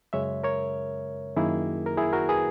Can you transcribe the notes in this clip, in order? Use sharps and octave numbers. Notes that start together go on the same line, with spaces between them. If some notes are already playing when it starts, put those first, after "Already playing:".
F#2 C#3 G#3 C#5 E5
A#4 C#5
F#2 D#3 A#3 E4 G#4
A#4
E4 G#4
F#4 A#4
G#4 B4